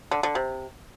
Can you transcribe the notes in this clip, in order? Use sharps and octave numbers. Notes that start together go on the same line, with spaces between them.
D3
D3
C3